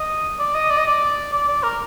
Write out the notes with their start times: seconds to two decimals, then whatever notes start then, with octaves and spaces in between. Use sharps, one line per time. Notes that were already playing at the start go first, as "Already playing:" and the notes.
Already playing: D#5
0.39 D5
0.55 D#5
0.70 D5
0.78 D#5
0.87 D5
1.33 D5
1.48 D5
1.63 A#4